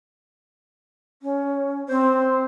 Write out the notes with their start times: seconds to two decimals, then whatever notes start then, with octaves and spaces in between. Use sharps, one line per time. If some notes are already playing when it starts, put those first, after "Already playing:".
1.22 C#4
1.89 C4 C5